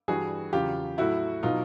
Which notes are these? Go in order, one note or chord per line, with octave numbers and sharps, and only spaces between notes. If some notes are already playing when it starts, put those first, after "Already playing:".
G2 E3 G3 F#4 G#4
E2 C#3 F#3 F4 G4
A2 F#3 E4 F#4
B2 F#3 D#4 F4